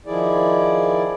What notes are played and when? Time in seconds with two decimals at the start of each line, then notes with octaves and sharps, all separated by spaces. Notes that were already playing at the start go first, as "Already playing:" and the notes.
0.06 D#3 F3 E4 G#4 D5